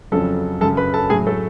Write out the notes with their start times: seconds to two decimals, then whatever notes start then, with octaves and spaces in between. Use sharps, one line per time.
0.12 F2 C#3 F#3 A4 A5
0.61 F#2 C#3 F#3 A4 A5
0.77 B4 B5
0.94 A4 A5
1.10 A2 F#3 G#4 G#5
1.27 A3 A4